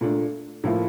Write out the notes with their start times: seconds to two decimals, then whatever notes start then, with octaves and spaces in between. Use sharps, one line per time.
0.01 A#2 A3 D4
0.64 A2 F3 A#3 E4